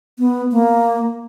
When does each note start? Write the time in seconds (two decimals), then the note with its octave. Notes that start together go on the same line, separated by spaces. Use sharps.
0.19 B3
0.52 A#3